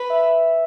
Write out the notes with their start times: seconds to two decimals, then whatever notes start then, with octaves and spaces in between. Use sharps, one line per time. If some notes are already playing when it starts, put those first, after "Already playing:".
Already playing: B4
0.10 E5